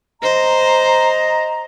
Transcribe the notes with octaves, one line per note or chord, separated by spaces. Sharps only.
C5 D#5 A#5